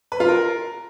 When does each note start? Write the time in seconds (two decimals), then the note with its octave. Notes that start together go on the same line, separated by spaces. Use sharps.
0.12 B4
0.20 F4
0.28 A#4